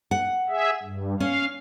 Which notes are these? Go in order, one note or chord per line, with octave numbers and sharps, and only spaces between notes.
F#5
G#4 E5
G2
C#4 F5